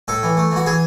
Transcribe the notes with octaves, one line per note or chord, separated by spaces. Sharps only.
A2 A4
E3
A3
E3 F#4
E3 G#4